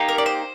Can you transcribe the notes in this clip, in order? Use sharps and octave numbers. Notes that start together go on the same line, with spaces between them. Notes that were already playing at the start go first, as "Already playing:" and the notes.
Already playing: A#3 D#4 G4
A#4
D5
C5